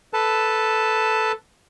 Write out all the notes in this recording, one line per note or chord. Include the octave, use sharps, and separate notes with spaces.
A4 B4 A5